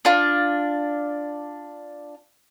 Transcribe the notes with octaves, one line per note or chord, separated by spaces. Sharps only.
D4 F4